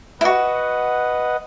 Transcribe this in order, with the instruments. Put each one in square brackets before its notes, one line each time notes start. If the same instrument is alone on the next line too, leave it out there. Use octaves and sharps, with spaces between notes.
[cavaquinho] E4 F#4 [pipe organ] B4 D#5 F#5